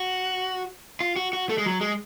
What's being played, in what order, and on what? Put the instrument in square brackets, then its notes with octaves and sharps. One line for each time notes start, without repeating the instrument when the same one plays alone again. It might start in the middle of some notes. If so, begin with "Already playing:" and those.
Already playing: [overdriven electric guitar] F#4
F4
F#4
F#4
A3
G#3
F#3
G#3